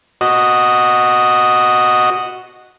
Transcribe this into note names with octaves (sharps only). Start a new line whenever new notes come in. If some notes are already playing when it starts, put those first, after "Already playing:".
F#4 D#5